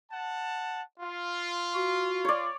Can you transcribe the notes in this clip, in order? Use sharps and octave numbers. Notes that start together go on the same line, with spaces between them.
F#5 A5
F4
F#4
C#5 D5